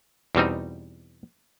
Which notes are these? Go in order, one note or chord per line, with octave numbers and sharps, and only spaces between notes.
E2 B2 G3 C4 D#4